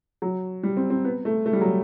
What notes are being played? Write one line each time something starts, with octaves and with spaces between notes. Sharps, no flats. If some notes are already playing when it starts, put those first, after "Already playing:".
F#3
G3
C4
C4
B3
A3
A3
G3
F#3